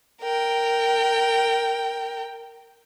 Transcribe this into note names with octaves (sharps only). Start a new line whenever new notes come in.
A#4 G5